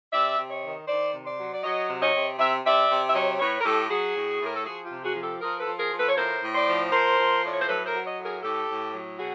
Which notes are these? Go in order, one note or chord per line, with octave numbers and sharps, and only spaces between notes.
C3 D5 E5
C3
C#5 D#5
D#3
D#3 C5 D5
C3
C5 D5
F#3
D5
F#3 C#5 D#5
C3
C#5 D#5
C3
C3 E5
C3 D5 E5
C3
E5
F#3 C#5 D#5
A2 B4 C#5
A#4
A2 G4 A4
F#3 F#4 G#4
A2
A2
A#4
A4
F3 F#4 G#4
F4 G4
C3
F#4 G#4
F3
G4 A4
F3 G#4 A#4
A4 B4
F3
G#4 A#4
F3
A4 B4
C#5
A2 A#4 C5
A2
C5 D5
F3
F3 A#4 C5
F3
A2 D5
C#5
C5
F#3 A4 B4
A#4 C5
F#3
C#5 D#5
A2
G#4 A#4
A2 G4 A4
A2
F#3
B2 F#4 G#4